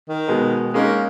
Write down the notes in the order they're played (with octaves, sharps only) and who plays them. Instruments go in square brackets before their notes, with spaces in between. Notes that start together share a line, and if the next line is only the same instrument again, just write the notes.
[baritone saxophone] D#3
[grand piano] B2 G#3 B3
[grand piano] G#3 C#4 D#4 [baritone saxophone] A#3